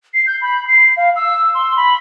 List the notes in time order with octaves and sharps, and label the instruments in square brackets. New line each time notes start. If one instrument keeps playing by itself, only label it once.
[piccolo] C7
G6
B5
C7
F5
E6
C6
B5